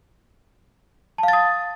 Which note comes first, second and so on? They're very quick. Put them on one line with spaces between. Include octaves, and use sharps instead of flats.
A5 F5 A6 D#6